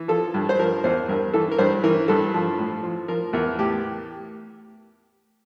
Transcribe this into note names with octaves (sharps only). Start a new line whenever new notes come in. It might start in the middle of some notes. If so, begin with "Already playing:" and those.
Already playing: E3
F3 A4
G2
C5
F3 A#4
E2 C5
G2 A#4
E3 A4
A#4
G2 C5
E3 A#4
G2 A4
F3
A2
F3
F3 A#4
E2 A#4
A2 G4